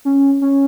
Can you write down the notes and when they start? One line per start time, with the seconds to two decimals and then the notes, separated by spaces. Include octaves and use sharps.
0.05 C#4
0.41 C#4